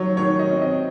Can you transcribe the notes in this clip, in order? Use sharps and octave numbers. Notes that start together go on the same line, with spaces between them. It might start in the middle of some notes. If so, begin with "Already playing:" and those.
Already playing: D#3 F#3 C#5
D#3 C#5
D#5
C4
D#5